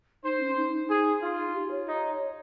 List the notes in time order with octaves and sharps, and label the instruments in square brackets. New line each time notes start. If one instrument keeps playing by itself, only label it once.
[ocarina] D#4 [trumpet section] C5
[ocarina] C#4
D#4
D#4
[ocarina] D#4 [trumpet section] G#4
[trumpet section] F4
[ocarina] G4
C#5
[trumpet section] D#4